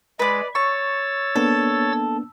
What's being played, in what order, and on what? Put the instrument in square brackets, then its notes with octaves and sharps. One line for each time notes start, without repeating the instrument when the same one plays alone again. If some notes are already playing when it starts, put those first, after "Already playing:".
[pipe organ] G#3 [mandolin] B4 D5
[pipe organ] C#5 E6 A6 [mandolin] C#6
[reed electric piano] A#3 B3 D4 [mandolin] A4